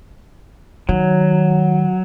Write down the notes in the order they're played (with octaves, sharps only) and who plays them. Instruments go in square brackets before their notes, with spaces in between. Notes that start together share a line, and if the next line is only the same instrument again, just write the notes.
[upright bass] D#3 [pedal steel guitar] F#3